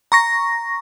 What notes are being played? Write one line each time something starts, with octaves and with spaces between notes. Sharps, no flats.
A#5 C#6 A#6